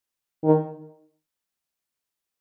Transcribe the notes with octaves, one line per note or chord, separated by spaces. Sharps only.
D#3